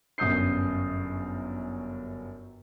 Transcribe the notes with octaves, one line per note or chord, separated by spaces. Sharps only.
G1 F#2 D#6 G6 C7